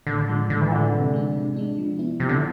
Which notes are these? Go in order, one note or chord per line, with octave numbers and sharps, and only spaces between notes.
A2 D3
F3 G#3
A2 D3
E3
D3 F3 G#3
C3
G#3 D4
C3
G#3 D4
F3
B3 E4
C3 F3
D3